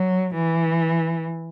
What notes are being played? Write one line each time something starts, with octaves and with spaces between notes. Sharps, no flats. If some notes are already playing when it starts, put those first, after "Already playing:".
Already playing: F#3
E3